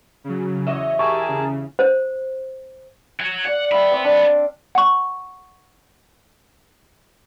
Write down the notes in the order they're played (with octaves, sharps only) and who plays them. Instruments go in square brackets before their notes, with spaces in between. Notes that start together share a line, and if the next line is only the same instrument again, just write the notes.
[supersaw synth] C#3 F#3
[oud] E2 F#4 E5 [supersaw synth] C#5 D#5
[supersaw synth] G4 G#5 E6 [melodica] G#4 A#4 A5 [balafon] C#6
[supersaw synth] C#3
[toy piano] C5
[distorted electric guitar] C#5 F#5
[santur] D5 F5 [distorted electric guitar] F#5
[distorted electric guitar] B3 B5 [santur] E5 F5 G5
[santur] C4 D5
D4
[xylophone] F#5 C#6